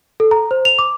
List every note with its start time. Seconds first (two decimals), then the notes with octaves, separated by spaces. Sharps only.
0.20 A4
0.31 A#5
0.51 C5
0.65 F7
0.79 D6